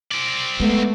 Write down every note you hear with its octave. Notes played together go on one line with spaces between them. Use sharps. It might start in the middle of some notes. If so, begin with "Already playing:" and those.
C4 D5
G#3 A3 B3